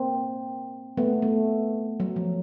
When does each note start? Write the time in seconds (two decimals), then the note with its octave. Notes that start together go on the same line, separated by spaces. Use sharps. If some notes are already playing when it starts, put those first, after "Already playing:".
Already playing: A#3 C4
0.97 A3 B3
1.22 A3
2.00 F#3
2.16 F3